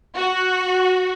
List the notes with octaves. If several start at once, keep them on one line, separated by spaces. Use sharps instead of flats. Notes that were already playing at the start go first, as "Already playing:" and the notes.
F#4